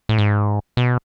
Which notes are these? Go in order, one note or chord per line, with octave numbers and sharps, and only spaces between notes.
A2
G#2
B2